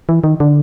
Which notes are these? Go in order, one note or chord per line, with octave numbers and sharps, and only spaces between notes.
E3
D#3
D3